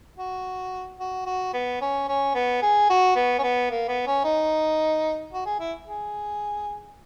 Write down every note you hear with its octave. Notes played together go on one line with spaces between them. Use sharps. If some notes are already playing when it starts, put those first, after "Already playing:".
F#4
F#4
F#4
B3
C#4
C#4
B3
G#4
F#4
B3
C#4
B3
A#3
B3
C#4
D#4
F#4
G#4
E4
G#4